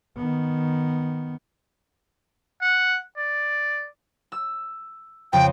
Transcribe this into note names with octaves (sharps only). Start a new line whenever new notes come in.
D#3 B3
F#5
D5
E6
F2 C#3 G5